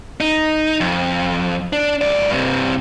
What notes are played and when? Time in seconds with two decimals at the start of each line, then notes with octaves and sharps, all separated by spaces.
0.20 D#4
0.80 F2
1.73 D4
2.01 C#2 D5
2.30 G2 C3